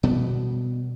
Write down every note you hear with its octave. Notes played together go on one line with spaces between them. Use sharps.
B2 G3 B3